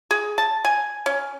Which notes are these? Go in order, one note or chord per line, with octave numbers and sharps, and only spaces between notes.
G#4
A5
G#5
C#4